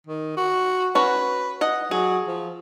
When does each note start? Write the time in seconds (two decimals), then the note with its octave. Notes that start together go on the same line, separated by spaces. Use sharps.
0.07 D#3
0.37 F#4
0.95 C#4 F#4 B4
1.61 D#5 F#5
1.91 F#3 G#4
2.28 F3